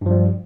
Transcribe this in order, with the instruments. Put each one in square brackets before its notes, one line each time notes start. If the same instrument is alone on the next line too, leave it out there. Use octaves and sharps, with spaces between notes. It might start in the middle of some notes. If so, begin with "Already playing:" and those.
[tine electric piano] G2
F3
G3